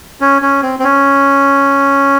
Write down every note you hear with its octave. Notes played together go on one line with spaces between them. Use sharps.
C#4
C#4
C4
C4
C#4